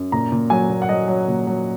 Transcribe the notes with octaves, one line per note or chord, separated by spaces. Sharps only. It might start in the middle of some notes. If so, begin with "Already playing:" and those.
Already playing: F#2
A#2 A#5
A#2
F#3 G#5
A#2
F#5
F#3 D#5
F#3
A#2
F#3